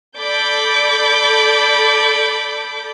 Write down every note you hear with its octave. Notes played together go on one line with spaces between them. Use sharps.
A4 D5 B5 D6 G6